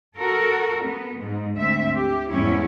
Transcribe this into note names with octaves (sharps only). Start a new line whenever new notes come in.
F#4 A4 A#4
B3
G#2
D2 C4 E5
G4
E2 G#2 G3 C#4 E4 C#5